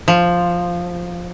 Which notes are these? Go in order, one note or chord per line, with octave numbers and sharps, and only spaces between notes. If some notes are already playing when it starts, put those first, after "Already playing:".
F3